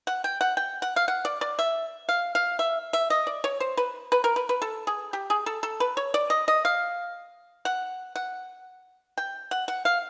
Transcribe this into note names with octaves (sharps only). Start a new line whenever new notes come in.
F#5
G5
F#5
G5
F#5
F5
F#5
D5
D5
E5
F5
F5
E5
E5
D#5
D5
C#5
C5
B4
B4
A#4
B4
B4
A4
G#4
G4
G#4
A4
A4
B4
C#5
D5
D#5
D#5
F5
F#5
F#5
G5
F#5
F#5
F5